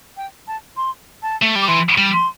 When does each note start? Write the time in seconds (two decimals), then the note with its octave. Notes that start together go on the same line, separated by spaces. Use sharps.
0.17 G5
0.47 A5
0.77 C6
1.23 A5
1.42 A3
1.55 G3
1.62 D6
1.68 E3 C6
1.98 G3
2.13 C6